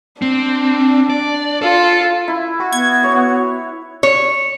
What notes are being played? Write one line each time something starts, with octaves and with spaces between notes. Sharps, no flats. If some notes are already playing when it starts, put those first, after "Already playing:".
C4 D4
D5
F4 A4
E4
F#4
B3 G#6
C#5
C#5